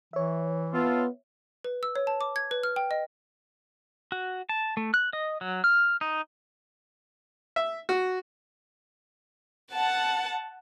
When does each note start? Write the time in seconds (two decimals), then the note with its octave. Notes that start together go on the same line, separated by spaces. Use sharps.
0.13 E3 C#5 E5
0.73 B3 F4 A4
1.65 B4
1.83 E6
1.96 C#5
2.07 A5
2.21 D6
2.36 G#6
2.51 B4
2.63 F6
2.76 G5
2.91 D#5
4.12 F#4
4.49 A5
4.77 A3
4.94 F#6
5.13 D#5
5.41 F#3
5.64 F6
6.01 D#4
7.56 E5
7.89 F#4
9.74 F#5 A5